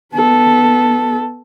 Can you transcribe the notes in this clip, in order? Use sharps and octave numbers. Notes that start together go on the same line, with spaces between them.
B3 A4